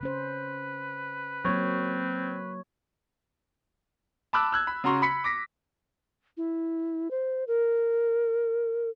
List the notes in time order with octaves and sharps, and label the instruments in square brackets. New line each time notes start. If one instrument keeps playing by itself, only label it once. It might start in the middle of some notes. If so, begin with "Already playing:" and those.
[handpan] C#3 C#4 C5 [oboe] B4
[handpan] F#3 A#3 [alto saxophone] C4 [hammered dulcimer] C#5
[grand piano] A5 B5 D6 E6 F#6
E6 F#6 G#6
B5
C#3 F#4 A#5 C6 C#6
B5 B6 C#7
D6 A#6 B6
[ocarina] E4
C5
A#4